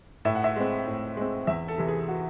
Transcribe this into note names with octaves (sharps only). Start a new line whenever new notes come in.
A2 E5
F#5
E5
G#3 C4
A2
G#3 C4
E2 E5
A4
C3 E3
G#4
F#4